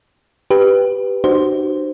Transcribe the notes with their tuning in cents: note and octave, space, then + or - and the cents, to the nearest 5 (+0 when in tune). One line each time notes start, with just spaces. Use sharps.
G4 +0 B4 +0
D#4 -45 F#4 +20 C5 +0